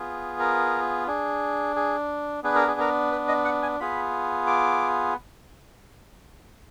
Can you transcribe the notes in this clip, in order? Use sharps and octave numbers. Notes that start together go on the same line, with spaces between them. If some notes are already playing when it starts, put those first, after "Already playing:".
Already playing: B3 F4 G#4
A#4
D4 G#4
G#4
B3 D4 G#4 B4
A#4
G#4
A#4
B4
D#5
F#5
G#5
B3 F4 G#4 B5
D6